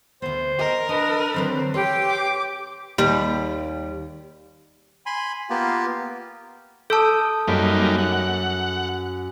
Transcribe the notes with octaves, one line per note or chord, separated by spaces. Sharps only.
D2 B3 C5
A#4 D#5
D4 B4 D#5
D3 F#3 C4 C5
G4 A4 B4 C#5 G5 C6
D6
D#2 G3
G#5 B5 C6
A#3 B3 F4 G4
A4 A5 D#6 E6 G6
F#2 G3 A#3 D#4 B6 D7
F#5